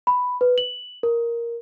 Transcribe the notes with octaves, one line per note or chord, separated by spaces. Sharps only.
B5
B4
F#7
A#4